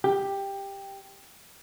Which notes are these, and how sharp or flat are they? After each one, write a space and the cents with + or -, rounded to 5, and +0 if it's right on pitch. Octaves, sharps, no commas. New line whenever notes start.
G4 +10